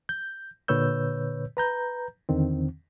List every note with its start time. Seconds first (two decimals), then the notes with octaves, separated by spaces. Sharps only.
0.09 G6
0.68 A#2 D3 B4 C#5 E6 G6
1.57 B4 A#5 G6
2.29 E2 D3 D#3 C4